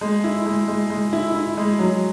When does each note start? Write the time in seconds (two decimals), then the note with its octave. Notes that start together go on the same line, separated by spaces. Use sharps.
0.01 G#3
0.24 E4
0.46 G#3
0.68 G#3
0.90 G#3
1.13 E4
1.35 E4
1.57 G#3
1.79 F#3